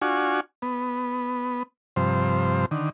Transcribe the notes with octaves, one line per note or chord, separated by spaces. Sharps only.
D4 F4 F#4 G#5 C#6
B3
G2 C3 F3 C5
D3 D#3